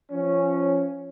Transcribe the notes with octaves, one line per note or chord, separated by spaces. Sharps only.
F3 C#4